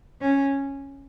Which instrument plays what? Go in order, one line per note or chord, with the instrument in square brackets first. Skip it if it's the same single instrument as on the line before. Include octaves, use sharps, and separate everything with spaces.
[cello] C#4